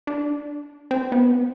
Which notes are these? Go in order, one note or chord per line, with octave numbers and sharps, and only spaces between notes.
D4
C4
B3